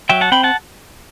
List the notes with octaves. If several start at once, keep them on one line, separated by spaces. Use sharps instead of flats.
F#3 E5 G5
F#5 A5
C4 G5 B5
F#5 A5